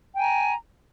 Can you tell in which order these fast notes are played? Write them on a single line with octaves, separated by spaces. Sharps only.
G5 G#5 A#5